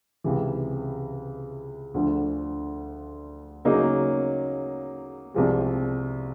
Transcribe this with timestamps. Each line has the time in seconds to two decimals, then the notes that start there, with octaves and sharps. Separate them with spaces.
0.24 C#2 C3 E3
1.94 D2 D3 F3
3.65 C#3 F#3 A#3 D#4
5.34 C2 C3 F3 G#3